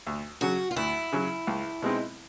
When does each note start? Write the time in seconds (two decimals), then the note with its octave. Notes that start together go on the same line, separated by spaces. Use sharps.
0.07 D2
0.41 C#3 F#3 F#4
0.71 F4
0.76 D2 E4
1.12 C#3 F#3
1.47 C#2
1.82 B2 G#3 C4 D#4